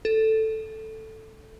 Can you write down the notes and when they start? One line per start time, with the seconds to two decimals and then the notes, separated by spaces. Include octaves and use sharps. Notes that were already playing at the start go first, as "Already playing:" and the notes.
0.05 A4